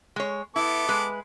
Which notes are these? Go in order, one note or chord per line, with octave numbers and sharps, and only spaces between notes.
G#3 C#5
B3 E4 A4 D6
G#3 B4